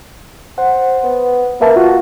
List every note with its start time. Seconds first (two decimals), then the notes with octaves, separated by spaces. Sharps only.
0.58 C5 F#5
1.04 B3
1.61 A#3 B4 E5 A5
1.76 F4 F#4